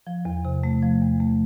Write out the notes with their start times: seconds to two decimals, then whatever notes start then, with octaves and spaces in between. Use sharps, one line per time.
0.07 F3
0.25 E2
0.45 C3
0.64 A3
0.82 F3
1.02 E2
1.20 A3